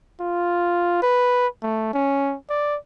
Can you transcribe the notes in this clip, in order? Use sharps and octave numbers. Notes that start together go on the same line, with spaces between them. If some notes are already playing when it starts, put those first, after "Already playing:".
F4
B4
A3
C#4
D5